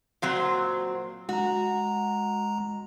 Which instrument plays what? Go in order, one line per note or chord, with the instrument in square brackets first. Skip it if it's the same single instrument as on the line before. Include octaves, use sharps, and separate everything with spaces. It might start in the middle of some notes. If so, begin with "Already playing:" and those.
[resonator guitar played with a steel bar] A#2 F#3 C4
[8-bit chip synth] G#3 A#5 [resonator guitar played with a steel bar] F#4